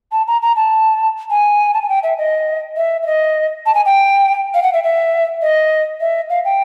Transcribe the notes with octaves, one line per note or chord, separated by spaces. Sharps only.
A5
A#5
A#5
A5
G#5
A5
G#5
G5
E5
D#5
E5
E5
D#5
A5
G#5
G5
F5
F#5
E5
E5
D#5
E5
F5
G5